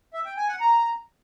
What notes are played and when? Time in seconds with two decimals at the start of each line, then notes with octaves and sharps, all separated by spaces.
0.14 E5
0.25 G5
0.37 G#5
0.49 F#5
0.60 A#5